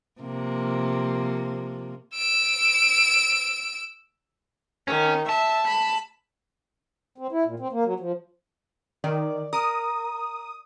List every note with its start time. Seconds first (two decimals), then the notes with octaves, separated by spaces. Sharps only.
0.21 C3 F3 A#3
2.15 E6 D7
4.88 D#3 C#4
5.29 E5 A5
5.68 B5
7.18 C4
7.32 E4
7.45 A#2
7.60 C4
7.72 A#3
7.84 F#3
8.00 F3
9.04 D#3 D5
9.53 A#4 D#6